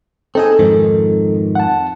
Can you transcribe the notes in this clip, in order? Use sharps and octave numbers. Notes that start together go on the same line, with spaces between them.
C4 D#4 G#4 A4
F2 G#2 D#3
F#5 A5